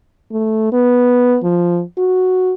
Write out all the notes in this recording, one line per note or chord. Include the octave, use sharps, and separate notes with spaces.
A3
B3
F3
F#4